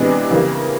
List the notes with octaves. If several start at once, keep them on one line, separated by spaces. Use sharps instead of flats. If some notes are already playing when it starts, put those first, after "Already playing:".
Already playing: C3 E3 G#3 B3 D4
C#3 E3 G3 A#3